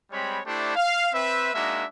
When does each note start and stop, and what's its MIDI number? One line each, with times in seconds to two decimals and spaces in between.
0.11 0.39 55
0.11 0.39 56
0.11 0.39 60
0.11 0.39 73
0.11 0.39 83
0.46 0.74 57
0.46 0.74 62
0.46 0.74 64
0.46 0.74 67
0.46 0.74 72
0.46 0.74 74
0.76 1.07 77
1.13 1.53 60
1.13 1.53 71
1.13 1.53 76
1.54 1.84 56
1.54 1.84 58
1.54 1.84 62
1.54 1.84 63
1.54 1.84 66
1.54 1.84 76